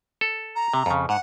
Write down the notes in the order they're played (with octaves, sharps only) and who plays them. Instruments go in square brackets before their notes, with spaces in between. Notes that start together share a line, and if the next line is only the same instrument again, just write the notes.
[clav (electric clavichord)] A4
[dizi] A#5
[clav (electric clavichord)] C3
F2 C#3
[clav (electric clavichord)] G#2 [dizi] F#5